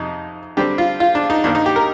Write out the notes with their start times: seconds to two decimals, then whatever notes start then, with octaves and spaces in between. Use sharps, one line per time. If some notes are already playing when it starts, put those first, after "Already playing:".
Already playing: F2 C3 D#4
0.57 D3 G3 C4 G4
0.78 F4
1.00 F4
1.15 D4
1.30 D#4
1.44 G2 D#3 A#3 D4
1.55 D#4
1.66 G4
1.76 A#4